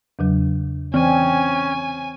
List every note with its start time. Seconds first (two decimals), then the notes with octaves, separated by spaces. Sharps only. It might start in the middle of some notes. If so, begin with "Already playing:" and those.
0.19 E2 C#3 F#3
0.94 E3 C4 C#4 G#5 C#6